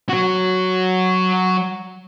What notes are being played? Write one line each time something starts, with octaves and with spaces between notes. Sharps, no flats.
F#3 F#4